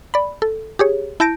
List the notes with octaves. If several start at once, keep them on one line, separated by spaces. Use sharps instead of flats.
D5 B5
A4
G4 G#4 C#5
E4 A5 G6 A#6 D7